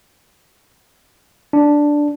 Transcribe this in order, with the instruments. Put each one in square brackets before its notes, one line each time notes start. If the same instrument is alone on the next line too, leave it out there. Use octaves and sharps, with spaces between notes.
[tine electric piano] D4